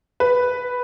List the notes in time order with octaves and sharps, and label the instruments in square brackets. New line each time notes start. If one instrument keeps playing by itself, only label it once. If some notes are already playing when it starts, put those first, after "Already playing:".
[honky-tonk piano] B4